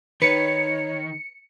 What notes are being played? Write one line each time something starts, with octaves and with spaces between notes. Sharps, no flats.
D#3 B4 C#5 C#7